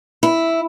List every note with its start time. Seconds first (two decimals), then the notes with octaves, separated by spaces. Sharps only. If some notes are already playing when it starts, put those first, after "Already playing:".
0.23 E4